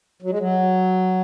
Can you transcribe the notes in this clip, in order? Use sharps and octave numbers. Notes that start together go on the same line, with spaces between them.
F#3
G#3
F#3